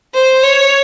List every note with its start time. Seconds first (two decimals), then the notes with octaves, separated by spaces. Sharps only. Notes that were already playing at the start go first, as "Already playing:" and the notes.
0.14 C5
0.43 C#5